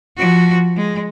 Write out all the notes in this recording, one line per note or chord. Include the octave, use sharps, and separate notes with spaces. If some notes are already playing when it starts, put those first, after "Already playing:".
F3 F#4
G#3